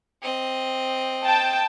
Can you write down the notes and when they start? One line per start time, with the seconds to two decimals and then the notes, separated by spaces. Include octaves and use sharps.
0.22 C4 D#5
1.24 G5 A5